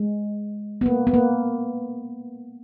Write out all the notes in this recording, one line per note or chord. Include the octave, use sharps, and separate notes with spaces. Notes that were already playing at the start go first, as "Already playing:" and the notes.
Already playing: G#3
B3
A#3
B3
A#3